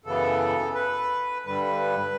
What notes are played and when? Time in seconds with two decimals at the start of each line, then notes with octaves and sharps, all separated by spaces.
0.04 F#2 C#3 E3 B3 A4
0.75 B4
1.45 G2 D3 G3 B4